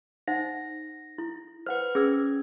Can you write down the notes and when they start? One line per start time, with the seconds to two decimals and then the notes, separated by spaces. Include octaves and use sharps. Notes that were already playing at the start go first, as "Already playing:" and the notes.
0.28 D#4 C5 F#5 A#6
1.18 E4
1.66 B4 C5 F#5 F6
1.95 C#4 G#4 E6 G#6